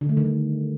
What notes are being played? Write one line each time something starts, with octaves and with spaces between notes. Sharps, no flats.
D3
A3
D#3
G3